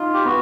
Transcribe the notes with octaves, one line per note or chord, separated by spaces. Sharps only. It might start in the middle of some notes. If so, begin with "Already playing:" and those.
Already playing: D#4 F4
G4
B3 F#4